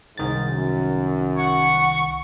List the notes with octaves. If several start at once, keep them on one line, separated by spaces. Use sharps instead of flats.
C2 G#2 D#3 A6
F#2
F#5 C#6